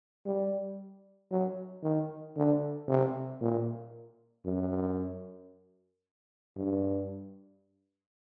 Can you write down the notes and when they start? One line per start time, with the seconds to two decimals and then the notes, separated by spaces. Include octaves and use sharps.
0.26 G3
1.31 F#3
1.83 D#3
2.36 D3
2.88 C3
3.41 A#2
4.45 F#2
6.56 G2